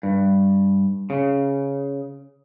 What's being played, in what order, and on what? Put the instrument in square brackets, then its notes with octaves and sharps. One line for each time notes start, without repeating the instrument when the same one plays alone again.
[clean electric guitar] G2
C#3